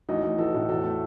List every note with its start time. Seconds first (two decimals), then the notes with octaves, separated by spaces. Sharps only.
0.09 A1 D#4 F#4
0.23 A1
0.38 E3 F#4 A4
0.54 A2
0.69 E2 F#4 A4
0.84 A3